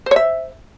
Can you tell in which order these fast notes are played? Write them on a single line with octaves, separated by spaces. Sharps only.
C5 C#5 E5